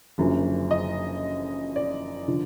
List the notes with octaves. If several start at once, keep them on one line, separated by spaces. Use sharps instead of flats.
F#1 F#2 D3 F3
D#5
D5
D3 F3